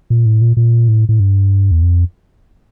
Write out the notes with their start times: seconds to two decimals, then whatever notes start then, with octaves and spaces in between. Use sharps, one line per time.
0.10 A#2
0.25 A2
0.41 A#2
0.57 A#2
0.88 A2
1.09 A2
1.20 G2
1.71 E2
1.82 F2